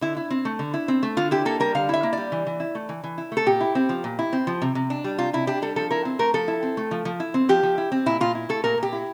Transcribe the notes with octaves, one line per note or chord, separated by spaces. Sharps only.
D3 E4
E4
C4
A3
D3
E4
C4
A3
D3 F4
E4 G4
A#3 A4
G3 A#4
D3 F5
E4 E5
A#3
G3 D5
E3
E3
E4
A3
E3
E3
E4
A3
A4
A#2 G4
E4
C4
F3
A#2
E4
C4
F3
C3
C3
D4
G3
C3 F4
C3 E4
D4 G4
G3 A4
F3 A4
E4 A#4
C4
A3 A#4
F3 A4
E4
C4
A3
F3
F3
E4
C4
F3 G4
F3
E4
C4
A#2 E4
A#2 F4
E4
A3 A4
A#2 A#4
A#2 G4
E4